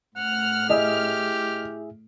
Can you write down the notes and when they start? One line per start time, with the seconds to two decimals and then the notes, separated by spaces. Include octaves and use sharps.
0.17 A2 F#5 F6
0.69 E4 G4 G#4 D#5 E5